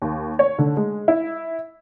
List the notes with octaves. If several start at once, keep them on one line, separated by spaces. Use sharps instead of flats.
D#2
C#5
D3
G#3
E4